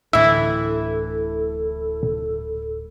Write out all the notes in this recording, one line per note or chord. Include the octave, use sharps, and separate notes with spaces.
D1 A2 D3 E3 E4 A4 E5